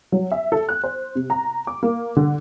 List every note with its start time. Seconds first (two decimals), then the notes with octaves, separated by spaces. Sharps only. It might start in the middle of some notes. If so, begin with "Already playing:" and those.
0.12 F#3
0.32 E5
0.52 A4
0.69 F#6
0.84 C5
1.15 C3
1.30 A#5
1.67 D6
1.83 A#3
2.16 D3